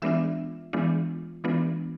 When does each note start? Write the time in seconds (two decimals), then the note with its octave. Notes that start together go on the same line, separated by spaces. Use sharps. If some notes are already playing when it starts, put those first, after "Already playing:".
0.02 E3 G#3 B3 D4 F4 E5
0.73 E3 G#3 B3 D4 F4
1.44 E3 G#3 B3 D4 F4